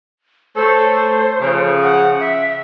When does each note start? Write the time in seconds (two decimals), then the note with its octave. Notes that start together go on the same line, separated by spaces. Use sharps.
0.56 A3 A4 C5 C#5
1.42 C#3 F3
1.83 F#5
2.20 E5